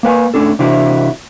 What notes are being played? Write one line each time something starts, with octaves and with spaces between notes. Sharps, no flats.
A#3 B4 G5 G#5
A2 C#4 D4 A4
C3 E3 D4 E4 F#4